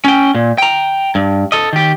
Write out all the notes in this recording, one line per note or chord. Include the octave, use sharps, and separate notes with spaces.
C#4 G5
A#2
G5 A#5
G2
A4 D#5
D#3 G4